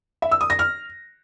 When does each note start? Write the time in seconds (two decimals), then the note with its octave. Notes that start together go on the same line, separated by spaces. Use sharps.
0.22 E5
0.31 E6
0.41 D#6
0.50 A#6
0.59 F6